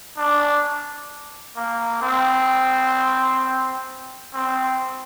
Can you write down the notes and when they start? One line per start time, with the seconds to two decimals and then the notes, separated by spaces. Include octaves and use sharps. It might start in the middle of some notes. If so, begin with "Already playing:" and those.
0.17 D4
1.56 A#3
2.02 C4
4.34 C4